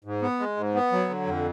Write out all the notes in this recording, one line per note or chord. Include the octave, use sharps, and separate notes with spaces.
G#2
B3
G#3
G#2
B3
F#3
D3
F2